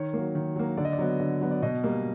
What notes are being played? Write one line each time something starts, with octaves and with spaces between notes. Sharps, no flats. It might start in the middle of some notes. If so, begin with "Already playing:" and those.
Already playing: D#3 C#5
F#3 A#3
D#3
F#3 A#3
D3 D5
D#5
D5
F#3 B3
D3
F#3 B3
D5
B2 D#5
G3 A#3